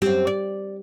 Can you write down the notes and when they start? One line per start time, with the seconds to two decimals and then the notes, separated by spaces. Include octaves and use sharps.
0.02 F#2 G3 C4 G4
0.27 D5